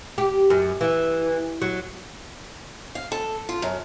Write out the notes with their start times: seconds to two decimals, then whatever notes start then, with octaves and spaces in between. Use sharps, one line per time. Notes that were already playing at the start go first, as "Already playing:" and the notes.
0.18 G4
0.50 F#2
0.81 E3
1.61 F#3
2.95 F5
3.12 A4
3.49 F4
3.62 F#2